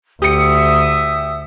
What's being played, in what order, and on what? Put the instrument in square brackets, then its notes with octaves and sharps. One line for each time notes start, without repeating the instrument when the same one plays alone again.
[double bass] D2 [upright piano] G4 C#7 [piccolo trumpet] E5 [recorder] D#6